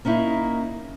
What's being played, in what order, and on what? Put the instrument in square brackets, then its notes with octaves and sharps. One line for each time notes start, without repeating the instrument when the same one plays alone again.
[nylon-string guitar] A#3 C#4 D#4 E4